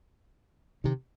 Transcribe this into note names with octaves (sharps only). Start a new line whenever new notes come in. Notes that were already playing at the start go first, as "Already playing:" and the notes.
C3 D#3